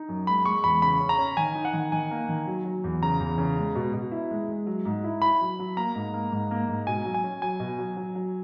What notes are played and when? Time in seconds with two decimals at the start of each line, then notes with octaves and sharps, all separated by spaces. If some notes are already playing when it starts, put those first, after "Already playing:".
Already playing: D#4
0.08 F#2
0.27 G#3 B5
0.45 G#3 C#6
0.64 E2 B5
0.82 C#3 B5
1.01 C#4
1.09 A#5
1.19 C#4
1.37 D#3 G#5
1.55 D#4
1.65 F#5
1.73 D#3
1.92 D#3 G#5
2.11 A#3
2.29 D#3
2.47 F#3
2.65 F#3
2.84 E2
3.02 C#3 A#5
3.20 E2
3.38 C#3
3.57 G#3
3.75 B2
3.94 B2
4.11 E4
4.31 G#3
4.49 G#3
4.66 F#3
4.85 G#2
5.04 E4
5.22 E4 B5
5.41 F#3
5.59 F#3
5.77 A#3 A#5
5.95 G#2
6.14 A#3
6.32 G#2
6.51 A#3
6.69 G#2
6.87 B2 G#5
7.05 F#3
7.14 G#5
7.24 C#4
7.42 F#3 G#5
7.60 B2
7.78 F#3
7.97 F#3
8.15 F#3